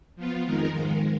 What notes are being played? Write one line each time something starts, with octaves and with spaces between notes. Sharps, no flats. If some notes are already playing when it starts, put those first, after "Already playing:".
F3 B3 F4
F2 D#3 G#3 D#4 A#4
G#2 D#3 G#3